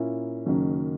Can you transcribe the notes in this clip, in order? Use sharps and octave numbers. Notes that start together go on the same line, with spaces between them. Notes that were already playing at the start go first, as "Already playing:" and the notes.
Already playing: A#2 A#3 C#4 E4
F#1 F#2 D#3 F#3